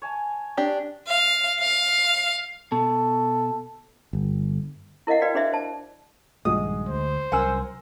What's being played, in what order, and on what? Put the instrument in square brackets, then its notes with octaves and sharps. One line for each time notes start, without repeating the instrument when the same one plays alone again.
[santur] C#5 G#5 A5
[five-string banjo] D4 G4
[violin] F5
F5
[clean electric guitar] B2 [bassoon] A4
[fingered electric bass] G1
[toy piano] E4 A#4 D#5 F5 F#5
F#4 B4 D5 F5 G5
D4 G#4 C5 D5 E5 F5
C5 A5
[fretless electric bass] A#1 G2 D#3 [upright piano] G#3 F#4 [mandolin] D#6
[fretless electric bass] D2 [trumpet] C5
[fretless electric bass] C2 F#3 C#4 [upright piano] A#4 [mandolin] F#5 G#5 E6